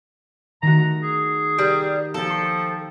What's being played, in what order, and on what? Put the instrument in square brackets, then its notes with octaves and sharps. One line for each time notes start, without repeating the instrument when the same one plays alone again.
[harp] D#3 A3 F#4 [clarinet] A#5
[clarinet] G#4
[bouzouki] G3 [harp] A#4
[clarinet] F3 [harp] A#3 G5 [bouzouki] A4
[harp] C#6 C7